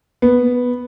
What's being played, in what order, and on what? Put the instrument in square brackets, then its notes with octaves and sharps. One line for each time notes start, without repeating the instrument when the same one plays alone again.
[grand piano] B3